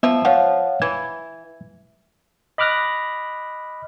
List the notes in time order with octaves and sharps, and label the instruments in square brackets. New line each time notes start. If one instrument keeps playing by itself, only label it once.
[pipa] F3 E5 [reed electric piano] B3
[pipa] F3 [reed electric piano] C#5 F5 F#5
[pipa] E3 [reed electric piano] G#6
[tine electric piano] D#5 B5 D6 F6 F#6 A#6